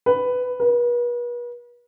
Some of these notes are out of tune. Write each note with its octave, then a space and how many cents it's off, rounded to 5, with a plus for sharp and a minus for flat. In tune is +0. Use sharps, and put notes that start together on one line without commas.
B4 +10
B4 -40